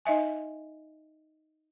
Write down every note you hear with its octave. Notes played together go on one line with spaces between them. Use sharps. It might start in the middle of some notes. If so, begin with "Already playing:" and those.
D#4 D#5 E5 G#5